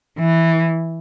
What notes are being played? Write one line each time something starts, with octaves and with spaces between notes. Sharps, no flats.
E3